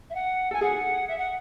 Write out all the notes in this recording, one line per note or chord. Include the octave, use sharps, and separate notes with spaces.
E5
F#5
A4 G#5
G#4 F#5
E5
F#5